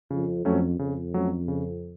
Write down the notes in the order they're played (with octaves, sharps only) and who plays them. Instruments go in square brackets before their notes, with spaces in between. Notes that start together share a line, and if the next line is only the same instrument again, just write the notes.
[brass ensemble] F2 [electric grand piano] C#3
[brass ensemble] F2 [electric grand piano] F#3 A3 C#4
[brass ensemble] F2 [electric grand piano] C#3
[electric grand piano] F#3 A3 C#4
C#3